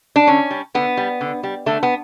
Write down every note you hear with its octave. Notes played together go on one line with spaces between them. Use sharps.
D4
D3 C#4
G3
D3 B3
G3
D3
G3
D3 A3
B3